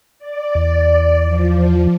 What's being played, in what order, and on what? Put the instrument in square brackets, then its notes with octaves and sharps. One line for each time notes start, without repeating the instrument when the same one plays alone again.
[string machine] D5
[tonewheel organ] E2
[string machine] F3